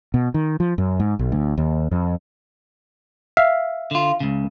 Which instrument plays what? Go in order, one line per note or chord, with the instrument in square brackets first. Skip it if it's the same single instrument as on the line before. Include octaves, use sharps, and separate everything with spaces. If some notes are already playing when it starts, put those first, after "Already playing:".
[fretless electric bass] B2
D#3
F3
F#2
G#2
B1
D2
D#2
F2
[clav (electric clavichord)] E5 F5
[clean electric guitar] D3 F4
C#2 C#3